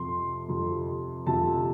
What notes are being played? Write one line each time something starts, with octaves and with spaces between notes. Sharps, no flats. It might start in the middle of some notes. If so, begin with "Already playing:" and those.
Already playing: F2 C3 F3 C6
F2 C3 F3
F2 C3 F3 A5